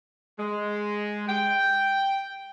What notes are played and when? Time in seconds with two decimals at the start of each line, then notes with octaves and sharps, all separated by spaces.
0.39 G#3
1.28 G5